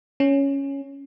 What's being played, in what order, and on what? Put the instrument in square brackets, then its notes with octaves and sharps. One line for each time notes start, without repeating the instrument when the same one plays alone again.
[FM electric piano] C#4